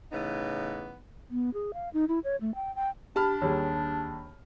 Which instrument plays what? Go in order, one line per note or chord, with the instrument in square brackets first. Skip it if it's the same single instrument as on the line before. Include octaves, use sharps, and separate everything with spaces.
[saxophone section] A2 C#3 E3 B3 D#4
[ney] B3
G#4
F5
D#4
E4
C#5
A3
G5
G5
[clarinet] D4 [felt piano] G4 [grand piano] A5 B5 F6
[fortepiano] D#2 G3 G#4 [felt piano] C#5